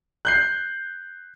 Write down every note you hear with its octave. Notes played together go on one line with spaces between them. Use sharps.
F#6 G6 C7